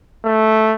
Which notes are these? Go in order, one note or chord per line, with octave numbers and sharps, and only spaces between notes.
A3